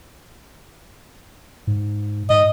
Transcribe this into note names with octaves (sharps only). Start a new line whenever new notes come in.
G#2
G#2 D#5